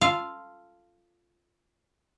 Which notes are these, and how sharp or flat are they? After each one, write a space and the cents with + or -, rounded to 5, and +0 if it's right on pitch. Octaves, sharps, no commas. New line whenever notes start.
F4 -5 A4 +0 F5 -5